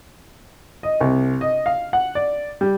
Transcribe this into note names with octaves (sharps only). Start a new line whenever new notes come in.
D#5
C2
D#5
F5
F#5
D5
G3